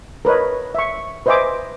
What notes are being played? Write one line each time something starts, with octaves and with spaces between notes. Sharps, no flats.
A#4 B4 C#5 D#5
E5 C#6
B4 C5 D#5 E5 G#5 D6